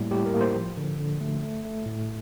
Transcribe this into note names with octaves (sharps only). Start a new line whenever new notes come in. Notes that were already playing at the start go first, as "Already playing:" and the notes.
Already playing: A2 G3 A#3
A2 G4
A#4
A#3
C5
F3
D3
D3
A3
A3
A3
A2